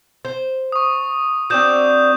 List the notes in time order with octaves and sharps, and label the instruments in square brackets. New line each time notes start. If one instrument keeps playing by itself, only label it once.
[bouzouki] C5
[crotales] C#6 D#6
[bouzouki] C4 D4 F#4 [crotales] D#6 G6 E7